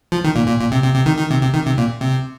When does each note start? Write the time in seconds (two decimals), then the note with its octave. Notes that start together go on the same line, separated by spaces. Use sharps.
0.12 F3
0.24 D#3
0.36 A#2
0.48 A#2
0.60 A#2
0.72 C3
0.83 C3
0.95 C3
1.06 D#3
1.18 D#3
1.30 C3
1.42 C3
1.54 D#3
1.65 C3
1.78 A#2
2.01 C3